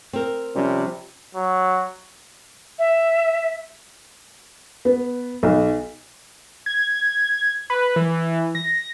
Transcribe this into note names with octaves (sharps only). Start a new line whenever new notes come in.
C4 A#4
C3 F3 G3 C#4
F#3
E5
B3
B1
G#6
B4
E3
A#6